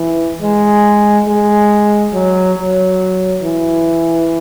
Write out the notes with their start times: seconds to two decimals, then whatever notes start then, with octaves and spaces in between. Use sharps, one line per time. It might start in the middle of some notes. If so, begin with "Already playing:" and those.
Already playing: E3
0.42 G#3
1.28 G#3
2.13 F#3
2.57 F#3
3.43 E3